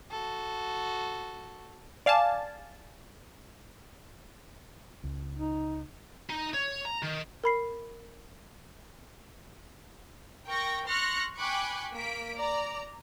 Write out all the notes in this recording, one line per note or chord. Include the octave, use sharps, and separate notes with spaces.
F#4 A4
D5 F5 G#5 A5
C#2
D#4
D#4
C#5
A#5
D#3
A#4 B5 C7
A#4 G5 C#6 A#6
C6 C#6 F6 F#6 A#6 C#7
G5 G#5 B5 C#6 D6 F#6
A#3 B6 D7
D5 A#5